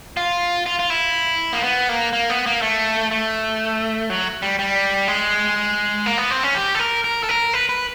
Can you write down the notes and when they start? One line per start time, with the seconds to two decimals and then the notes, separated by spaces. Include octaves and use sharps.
0.17 F4
0.66 F4
0.79 F4
0.90 E4
1.53 A#3
1.63 B3
1.89 A#3
2.13 A#3
2.30 B3
2.46 A#3
2.62 A3
3.11 A3
4.10 F#3
4.42 G3
4.59 G3
5.08 G#3
6.06 A#3
6.18 B3
6.31 C4
6.43 C#4
6.55 G4
6.75 A4
6.79 A#4
7.04 A#4
7.23 A4
7.29 A#4
7.53 B4
7.69 B4